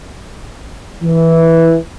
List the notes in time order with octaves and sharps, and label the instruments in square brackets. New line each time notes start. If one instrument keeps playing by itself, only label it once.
[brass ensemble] E3